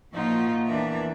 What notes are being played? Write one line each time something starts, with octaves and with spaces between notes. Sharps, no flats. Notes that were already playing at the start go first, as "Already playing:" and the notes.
A#2 F3 A#3 D#4 F4 F#4
E2 E3 D4 A#4 E5